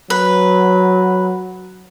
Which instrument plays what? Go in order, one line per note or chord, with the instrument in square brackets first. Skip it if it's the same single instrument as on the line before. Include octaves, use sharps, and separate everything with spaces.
[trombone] F#3 [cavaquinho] B4